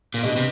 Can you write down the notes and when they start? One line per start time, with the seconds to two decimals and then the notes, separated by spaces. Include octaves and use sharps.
0.14 A#2
0.23 B2 D4 G4 B4 D#5
0.36 C3